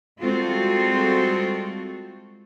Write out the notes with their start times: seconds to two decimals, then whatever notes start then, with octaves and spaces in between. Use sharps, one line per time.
0.21 G3 G#3 C4 F4 F#4 A4